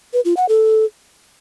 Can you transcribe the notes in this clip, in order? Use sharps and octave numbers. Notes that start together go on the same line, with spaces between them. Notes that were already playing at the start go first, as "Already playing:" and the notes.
B4
F4
F#5
A4